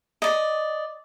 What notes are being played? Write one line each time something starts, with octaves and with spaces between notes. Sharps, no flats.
D5 D#5